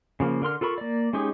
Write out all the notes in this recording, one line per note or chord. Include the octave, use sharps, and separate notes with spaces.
C#3 F3 A#3
D3 A#4 C6 F6
F4 A4 A#4 B5 C#6
A#3 D5
G#3 C#4 D#4 G4 G#4